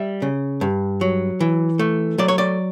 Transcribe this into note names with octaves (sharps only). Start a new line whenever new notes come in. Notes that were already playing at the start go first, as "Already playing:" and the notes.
Already playing: G3 E5
C#3
G2
F#3
E3
A3
F#3 D5
C#5
D5